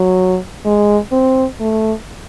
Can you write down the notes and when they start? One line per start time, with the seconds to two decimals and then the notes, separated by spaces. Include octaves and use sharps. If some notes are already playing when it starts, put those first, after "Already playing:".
Already playing: F#3
0.65 G#3
1.12 C4
1.60 A3